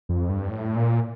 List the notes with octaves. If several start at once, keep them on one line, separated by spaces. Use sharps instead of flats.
F2
G2
A2
A#2